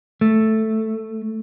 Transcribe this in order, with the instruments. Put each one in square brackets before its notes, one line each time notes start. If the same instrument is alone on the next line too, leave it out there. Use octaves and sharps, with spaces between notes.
[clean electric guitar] A3